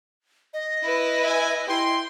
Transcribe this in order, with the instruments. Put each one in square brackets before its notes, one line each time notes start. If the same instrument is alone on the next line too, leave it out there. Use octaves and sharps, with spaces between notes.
[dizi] D#5
[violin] E4 B4
[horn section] E5 G#5
[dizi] E4 [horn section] G5 C6